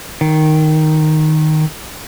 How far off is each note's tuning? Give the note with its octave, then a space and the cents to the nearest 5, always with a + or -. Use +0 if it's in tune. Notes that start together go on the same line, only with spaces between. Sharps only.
D#3 +0